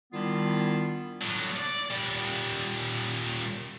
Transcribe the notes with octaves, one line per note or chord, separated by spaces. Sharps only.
D#3 G3 B3 D4 E4 F4
A2 F#3
D5
A#2 G3